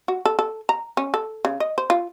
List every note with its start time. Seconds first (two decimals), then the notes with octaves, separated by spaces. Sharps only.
0.08 F#4
0.25 A4
0.39 A4
0.69 A#5
0.97 C#4
1.14 A4
1.45 C#3
1.60 D#5
1.78 C5
1.90 F4